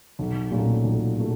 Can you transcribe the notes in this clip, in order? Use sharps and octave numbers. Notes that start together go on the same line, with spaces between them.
B1
A#2 F#3 A3 C#4
B1
A#2 F#3 A3